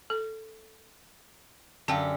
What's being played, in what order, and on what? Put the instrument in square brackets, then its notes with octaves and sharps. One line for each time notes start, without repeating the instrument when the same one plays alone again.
[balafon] A4
[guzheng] F#2 D3 G4 [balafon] F5 G5 A5